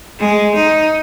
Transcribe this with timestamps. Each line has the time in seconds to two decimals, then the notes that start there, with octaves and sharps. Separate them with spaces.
0.19 G#3
0.55 D#4